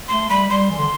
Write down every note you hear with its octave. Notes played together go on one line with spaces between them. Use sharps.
A3 C6
G3 B5
G3 C6
E3
D3